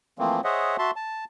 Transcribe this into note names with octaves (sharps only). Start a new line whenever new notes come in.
E3 F3 A3 A#3 C4
G#4 C5 C#5 D#5 E5 F#5
F#4 E5 A5 C6
A5